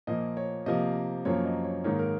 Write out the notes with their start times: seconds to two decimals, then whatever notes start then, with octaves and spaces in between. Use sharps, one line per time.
0.07 A#2 F3 A#3 D#5
0.37 C#5
0.66 C3 F3 A#3 D#5
1.25 F#2 F3 A#3 C#5
1.45 D#5
1.64 C#5
1.84 G#2 D#3 A#3 C#5
1.99 A#4